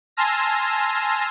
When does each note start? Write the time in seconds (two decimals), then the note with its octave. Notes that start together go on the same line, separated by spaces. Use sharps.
0.17 G#5 A5 C6 E6 F6 A#6